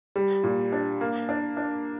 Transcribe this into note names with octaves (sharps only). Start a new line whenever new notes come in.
G3
A#2
D4
A#3
D4
D4